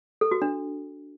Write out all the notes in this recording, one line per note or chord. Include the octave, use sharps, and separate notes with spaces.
A4
F#4
D4